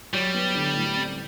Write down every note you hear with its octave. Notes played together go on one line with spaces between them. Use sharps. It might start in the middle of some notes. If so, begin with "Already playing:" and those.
F#3 G3
B3
D3
A2
C4